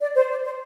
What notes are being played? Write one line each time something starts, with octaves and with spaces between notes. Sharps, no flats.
D5
C5
D5
C5